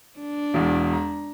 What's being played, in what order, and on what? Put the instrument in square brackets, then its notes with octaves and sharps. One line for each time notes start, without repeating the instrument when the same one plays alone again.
[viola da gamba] D4
[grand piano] E1 E2
A#5